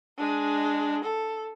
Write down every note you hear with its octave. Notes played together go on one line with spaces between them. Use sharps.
G#3 D4
A4